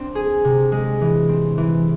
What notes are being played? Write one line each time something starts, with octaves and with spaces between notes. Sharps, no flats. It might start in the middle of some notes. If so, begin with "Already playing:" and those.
Already playing: C4 D4
G#4
C3
G#3
E3
C4
E3